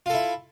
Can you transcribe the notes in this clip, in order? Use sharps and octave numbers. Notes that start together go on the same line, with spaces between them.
E4 F4 A4